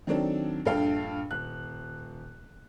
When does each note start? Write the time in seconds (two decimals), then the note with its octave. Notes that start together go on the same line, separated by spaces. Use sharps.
0.07 D#3 F#3 C4 D4 A4
0.65 A#1 G2 A4 F5 G5
1.31 D#1 F#6